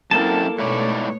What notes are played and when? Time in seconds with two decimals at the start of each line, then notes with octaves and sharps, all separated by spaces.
0.11 F#2 A#3 C4 E4 A4 A5
0.59 G#2 B2 A3 B3 E4 C#5 D5